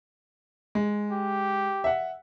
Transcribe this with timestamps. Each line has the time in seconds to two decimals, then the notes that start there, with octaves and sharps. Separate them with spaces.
0.75 G#3
1.12 G4
1.84 E5 F#5